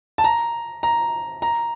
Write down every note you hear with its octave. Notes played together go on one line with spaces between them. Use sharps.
A5
A#5
A#5
A#5